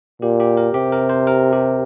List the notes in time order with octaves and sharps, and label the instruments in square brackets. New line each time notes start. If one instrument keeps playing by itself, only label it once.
[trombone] A#2 [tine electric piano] G4
[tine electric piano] G4
A#4
[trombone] C3 [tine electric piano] G4
[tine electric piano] A#4
C5
A#4
G4